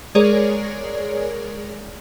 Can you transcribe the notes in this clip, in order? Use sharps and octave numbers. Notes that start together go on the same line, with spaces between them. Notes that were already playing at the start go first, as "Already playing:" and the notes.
G#3 G#4 A#4 C#5 D5